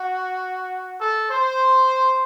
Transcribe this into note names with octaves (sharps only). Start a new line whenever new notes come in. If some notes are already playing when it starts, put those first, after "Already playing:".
Already playing: F#4
A4
C5